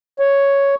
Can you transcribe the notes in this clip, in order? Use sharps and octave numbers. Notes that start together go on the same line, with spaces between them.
C#5